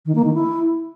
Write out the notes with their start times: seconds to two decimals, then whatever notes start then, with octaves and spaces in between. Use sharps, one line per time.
0.06 D#3
0.15 A#3
0.24 D#3
0.34 E4